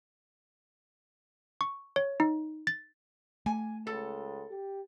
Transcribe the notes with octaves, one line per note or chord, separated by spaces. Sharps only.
C#6
C#5
D#4
A6
A3 G#5
C#2 A4
G4